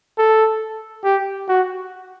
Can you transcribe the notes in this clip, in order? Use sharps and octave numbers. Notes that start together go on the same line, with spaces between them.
A4
G4
F#4